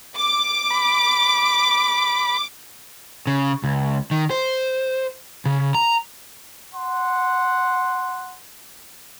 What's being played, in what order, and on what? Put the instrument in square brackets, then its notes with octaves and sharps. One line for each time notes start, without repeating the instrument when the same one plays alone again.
[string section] D6
[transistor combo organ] B5
[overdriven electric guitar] C#3
C#2
D#3
C5
C#3
A#5
[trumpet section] F#5 C6